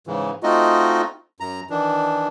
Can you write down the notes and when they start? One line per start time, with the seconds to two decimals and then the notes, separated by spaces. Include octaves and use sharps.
0.07 G#2 C#3 E3
0.43 A3 C4 D#4 F4 F#4 D#5
1.40 F#2 A#5
1.70 D#3 E3 D4